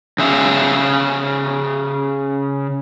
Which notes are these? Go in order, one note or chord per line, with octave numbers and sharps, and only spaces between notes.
C#3 G#4 E5 F5